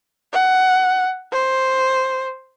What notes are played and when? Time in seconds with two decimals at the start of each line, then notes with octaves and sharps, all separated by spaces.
0.33 F#5
1.32 C5